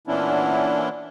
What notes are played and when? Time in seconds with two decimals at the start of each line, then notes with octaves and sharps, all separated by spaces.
0.07 A#2 E3 B3 C#4 D4 E4